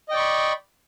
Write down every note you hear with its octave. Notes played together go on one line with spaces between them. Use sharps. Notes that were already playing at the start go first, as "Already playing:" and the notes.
D5 D#5 G5 B5 C#6